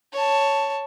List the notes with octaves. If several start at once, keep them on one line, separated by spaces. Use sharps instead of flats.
C#5 A5